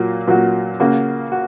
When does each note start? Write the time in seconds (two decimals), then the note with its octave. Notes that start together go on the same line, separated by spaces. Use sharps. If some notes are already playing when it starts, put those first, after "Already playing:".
Already playing: A#2 F#3 A#3 F#4
0.27 A#2 F#3 A#3 F#4
0.80 C#3 A#3 F#4
1.32 F#4